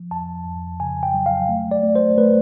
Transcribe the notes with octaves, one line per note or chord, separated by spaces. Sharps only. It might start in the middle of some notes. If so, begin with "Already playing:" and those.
Already playing: F3
F2 A5
F2
C#3 G#5
G5
F#3
F5
A3
D5
A3
C5
A3 B4